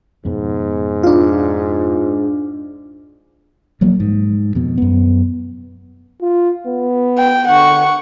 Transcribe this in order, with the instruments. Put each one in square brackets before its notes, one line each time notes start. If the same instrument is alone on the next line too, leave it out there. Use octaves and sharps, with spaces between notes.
[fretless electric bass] F2 B2 B3 [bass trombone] G#2
[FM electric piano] D4 F4
[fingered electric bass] B1 F3 F#3 A#3
G#2
F2 B2
F#2 B3
[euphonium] F4
B3
[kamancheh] G5
[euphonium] D3 [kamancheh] F#5 C#6